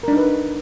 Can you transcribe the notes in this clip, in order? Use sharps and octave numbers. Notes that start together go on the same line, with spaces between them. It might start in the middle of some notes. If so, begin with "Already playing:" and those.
D4 D#4 A#4 B4